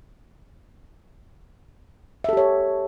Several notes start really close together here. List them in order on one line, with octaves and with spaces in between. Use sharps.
E5 A4 G4 C#5